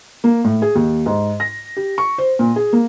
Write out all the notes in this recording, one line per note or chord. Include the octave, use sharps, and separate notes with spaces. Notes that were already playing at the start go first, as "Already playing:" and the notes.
A#3
A2
G#4
D#2
G#2
A#6
G4
C#6
C5
A#2
G#4
A#3